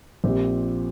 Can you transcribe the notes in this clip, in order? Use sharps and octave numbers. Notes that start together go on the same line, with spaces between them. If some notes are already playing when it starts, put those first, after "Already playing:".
A#1 A#2 F3 C4 G4